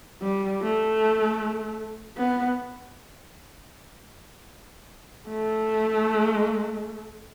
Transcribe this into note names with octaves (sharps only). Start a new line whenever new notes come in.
G3
A3
B3
A3